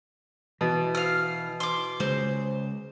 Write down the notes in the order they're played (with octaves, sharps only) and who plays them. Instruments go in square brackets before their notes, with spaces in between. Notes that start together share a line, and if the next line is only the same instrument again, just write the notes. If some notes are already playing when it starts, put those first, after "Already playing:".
[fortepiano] B2 [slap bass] E3
[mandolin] F5 F6
C6 D6
[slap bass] C#3 G#3 [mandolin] C5